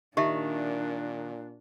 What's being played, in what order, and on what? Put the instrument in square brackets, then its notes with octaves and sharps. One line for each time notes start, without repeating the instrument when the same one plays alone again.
[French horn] A#2 [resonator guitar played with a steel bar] D#3 [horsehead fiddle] D4 [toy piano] G4 E5 A5